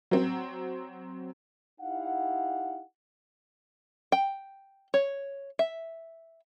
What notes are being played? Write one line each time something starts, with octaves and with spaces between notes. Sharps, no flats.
F#3 C4
D#4 E4 G4 F5 F#5
G5
C#5
E5